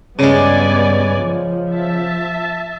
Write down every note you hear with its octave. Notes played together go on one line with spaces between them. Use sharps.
G2 C#3 G#3 B3 D5 G#5
F3
E5 A5